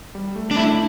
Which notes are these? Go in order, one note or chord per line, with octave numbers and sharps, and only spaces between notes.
G3
A3
D4
A3 E4